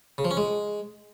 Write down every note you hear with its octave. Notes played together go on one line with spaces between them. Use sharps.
C#3
F3
C#4
G#3